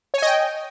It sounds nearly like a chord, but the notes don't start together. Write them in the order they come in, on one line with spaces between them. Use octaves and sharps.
C#5 G#5 D#5 G5